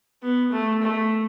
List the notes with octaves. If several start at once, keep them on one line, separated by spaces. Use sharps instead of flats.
B3
A3
A3